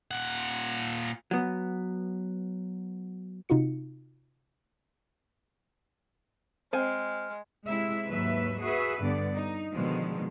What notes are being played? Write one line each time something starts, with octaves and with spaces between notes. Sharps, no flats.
A#2 F#5
F#3 B3
C3 D#4 F4 F#4 C#7
G#3 C4 G#5 F6
C3 G#3 E4 E5
D#2 G#2 F#3 B4 E5
F#4 G#4 B4 E5
G2 D3 B3 D5
D#4
B2 D3 D#3 F3 G#3